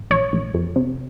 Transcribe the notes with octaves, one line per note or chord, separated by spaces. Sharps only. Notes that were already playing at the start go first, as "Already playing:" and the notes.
Already playing: G#1
A#1 C#5
A#1
F2
C3